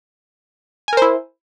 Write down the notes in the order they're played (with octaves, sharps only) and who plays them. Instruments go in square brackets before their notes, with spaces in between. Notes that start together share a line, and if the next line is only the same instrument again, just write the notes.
[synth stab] G#5
A#4
C5
E4